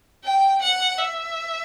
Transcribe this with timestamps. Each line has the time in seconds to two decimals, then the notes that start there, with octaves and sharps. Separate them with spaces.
0.24 G5
0.62 F#5
0.98 E5